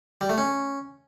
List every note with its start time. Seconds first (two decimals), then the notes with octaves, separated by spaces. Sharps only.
0.21 G3
0.29 A3
0.38 C#4